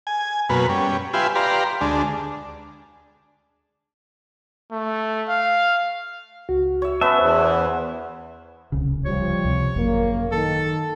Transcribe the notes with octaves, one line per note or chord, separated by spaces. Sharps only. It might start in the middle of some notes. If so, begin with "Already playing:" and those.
G#5
F#2 B2 A#3 B4
G3 C#4
F4 G4 B4 E5 G#5 C6
G4 B4 D5 F5 A#5 C6
D2 G#3 D4
A3
F5
C#2 F#4
C#5 E5
B3 C#4 B4 E5 A5
E2 C5
D1 C2 C#3
F3 G3 C#5
C#2 C3
G#1 F#2 A#2 C#3 A#3
D#3 A4